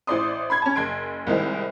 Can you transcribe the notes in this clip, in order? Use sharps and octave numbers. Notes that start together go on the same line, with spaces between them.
A1 E4 C5 D5 C6 D#6
B5 C6 G#6
C#4 A5
F#1 C6 G#6 D7
C2 D#3 G#3 E4 C5